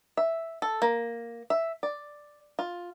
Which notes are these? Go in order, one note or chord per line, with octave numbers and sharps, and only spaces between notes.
E5
A4
A#3
E5
D5
F4